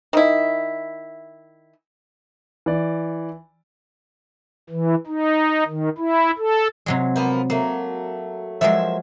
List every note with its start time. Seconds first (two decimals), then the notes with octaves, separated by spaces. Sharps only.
0.13 D#3 E4
2.66 E3 D5
4.70 E3
5.07 D#4
5.67 D#3
5.98 E4
6.38 A4
6.86 C3 F#3 G#3
7.16 F3 A#3 B3
7.50 F#3 A3 A#3
8.61 F3 F#3 G#3 A#3 C5 E5